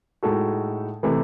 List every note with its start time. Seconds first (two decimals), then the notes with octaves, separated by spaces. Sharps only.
0.23 A2 G#3 D#4 F#4 A4
1.03 C3 E3 A3